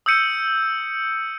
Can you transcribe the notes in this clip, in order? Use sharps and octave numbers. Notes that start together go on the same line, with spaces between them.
D#6 E6 G6 C#7 D#7